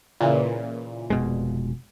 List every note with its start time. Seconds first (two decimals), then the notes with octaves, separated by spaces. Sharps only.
0.21 A#2 C#3 E3
1.10 F1 B2 G#3